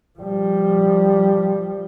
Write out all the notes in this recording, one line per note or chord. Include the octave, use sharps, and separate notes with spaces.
F3 G3